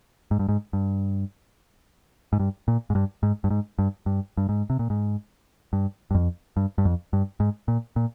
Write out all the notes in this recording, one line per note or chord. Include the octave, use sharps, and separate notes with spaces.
G#2
G2
G#2
G2
G#2
G2
A#2
G#2
G2
G#2
G2
G#2
G2
G2
G2
G#2
C3
A#2
G#2
G2
G2
F2
G2
G2
F2
G2
G#2
A#2
A#2